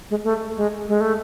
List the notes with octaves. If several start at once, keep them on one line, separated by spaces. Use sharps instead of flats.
G#3
A3
G#3
G#3
A3